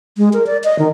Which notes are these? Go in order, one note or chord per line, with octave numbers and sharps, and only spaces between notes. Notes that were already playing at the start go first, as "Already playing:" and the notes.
G#3
A#4
D5
D#5
D#3